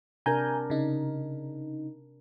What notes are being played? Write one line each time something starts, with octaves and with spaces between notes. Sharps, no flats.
C3 D4 A#4 G#5 A#5 G6
C#3 D#4